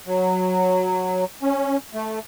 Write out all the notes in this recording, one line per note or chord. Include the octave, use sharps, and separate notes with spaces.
F#3
C#4
A3